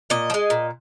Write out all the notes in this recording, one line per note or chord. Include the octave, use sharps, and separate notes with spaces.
A#2 D#5
F3
G#3
A#2